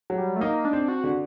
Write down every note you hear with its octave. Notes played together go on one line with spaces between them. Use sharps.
F#3
G3
A3
A#3 D#4
D4
C4
F#4
D3